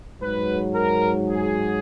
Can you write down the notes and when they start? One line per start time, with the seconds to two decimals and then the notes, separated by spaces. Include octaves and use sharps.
0.21 G#2 F#3 B4
0.75 A#4
1.28 G#4